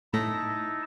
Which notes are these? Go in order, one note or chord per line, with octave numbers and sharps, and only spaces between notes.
A2 A3 D#4 E4 A5 A#6